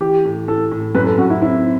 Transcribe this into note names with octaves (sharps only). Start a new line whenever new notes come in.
E3 G4
A2
A2 A4
A2
F#2 B4
A4
F#2 F#4
E4
C4 E4